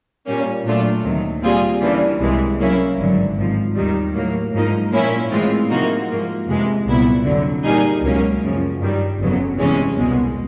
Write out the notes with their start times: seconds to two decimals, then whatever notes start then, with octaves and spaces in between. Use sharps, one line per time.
0.26 A#2 G3 A#3 C#4
0.64 A#2 F#3 A3 D4 F4
1.03 D2 C3 D#3 F#3
1.42 A#2 G3 C4 F4 G#4
1.81 C#3 E3 G3 A#3 D4
2.20 C2 C3 E3 G#3
2.59 C#3 F#3 A#3 C#4 E4
2.98 G#1 G2 D3 F#3
3.37 G#1 G#2 F3
3.76 D#2 D#3 G3
4.14 A2 F#3 A#3
4.54 G#2 F3 A#3 D#4
4.91 A#2 F3 A#3 C#4 E4
5.31 A2 E3 G#3 C4 F4
5.70 C3 F3 A#3 D#4 F#4
6.09 G#2 F3 A#3
6.47 F2 C3 E3 G#3
6.87 C2 A#2 F#3 B3 E4
7.24 F2 D3 F#3
7.64 A#2 G3 A#3 D#4 G#4
8.02 C#2 B2 F#3 A#3 C#4
8.42 F#2 C#3 F3
8.80 G2 D#3 G3
9.20 G1 F2 C#3 F#3 B3
9.58 E2 C3 E3 G#3 C#4
9.97 C2 B2 G#3